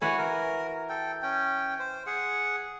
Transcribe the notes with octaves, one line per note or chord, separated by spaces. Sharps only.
E3 F#4 B4 C#5 G#5
A#4
A4 G5
C#4 G5
C5
G#4 F#5